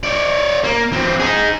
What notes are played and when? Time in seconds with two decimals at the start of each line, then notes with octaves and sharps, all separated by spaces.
0.03 C#5 D5
0.64 A#3
0.92 E3 C4
1.20 D#4 G#4